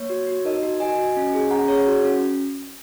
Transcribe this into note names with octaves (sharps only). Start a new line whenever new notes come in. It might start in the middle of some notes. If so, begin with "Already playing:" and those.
Already playing: A#3 C#5
F#4
F#4
D#4 A#4 D#5
F#4
F#4 D#5 G#5
F#4
C#4
G#4
C#4 F#5 A#5
G#4 C#5 F#5
F#4
C#4